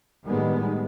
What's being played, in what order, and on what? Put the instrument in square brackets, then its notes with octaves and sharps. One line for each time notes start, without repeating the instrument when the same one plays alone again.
[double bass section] A2 D#3 G3 G#3 B3